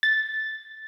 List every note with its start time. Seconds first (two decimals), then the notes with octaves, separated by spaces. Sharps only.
0.03 A6